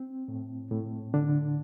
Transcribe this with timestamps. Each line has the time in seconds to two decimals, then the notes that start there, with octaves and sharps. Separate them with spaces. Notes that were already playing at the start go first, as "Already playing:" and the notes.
Already playing: C4
0.28 A2
0.71 A2
1.14 D3 D4